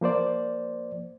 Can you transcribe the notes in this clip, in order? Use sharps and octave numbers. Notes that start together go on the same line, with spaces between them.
F3 A#3 C5 D5